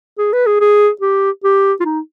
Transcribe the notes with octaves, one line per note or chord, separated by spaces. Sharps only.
G#4
B4
G#4
G#4
G4
G4
F4
D#4